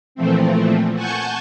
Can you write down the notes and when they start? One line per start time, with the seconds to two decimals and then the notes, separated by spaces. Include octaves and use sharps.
0.15 A#2 E3 F3 A3 C4
0.94 F#5 G#5 A5 C#6 G6